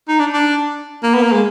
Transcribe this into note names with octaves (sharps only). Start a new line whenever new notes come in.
D#4
D4
D4
A#3
B3
A#3
G#3